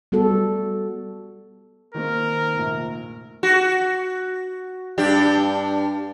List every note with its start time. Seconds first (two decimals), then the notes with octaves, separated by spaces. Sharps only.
0.12 G3 B3 F#4 A4
1.94 D#3 A#3 C4 A#4
2.54 F1 A#1
3.43 F#4
4.98 G2 D4 G4